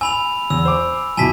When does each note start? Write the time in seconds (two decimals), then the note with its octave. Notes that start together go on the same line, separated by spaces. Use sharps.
0.01 G#5 B5 E6 F7
0.50 E2 E6
0.65 C5 D6
1.17 F2 B2 E4 G#5 A5 B6